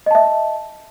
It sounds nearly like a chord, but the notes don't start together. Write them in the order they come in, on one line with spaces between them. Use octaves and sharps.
D#5 A5 E5